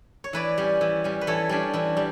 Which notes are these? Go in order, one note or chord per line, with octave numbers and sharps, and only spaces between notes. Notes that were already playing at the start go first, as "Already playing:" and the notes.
C#5
E3 B4 D5
G3 C#4
E3
G3 C#4
B4
E3 A4 C#5
G3 C#4 D4
E3 E4
G3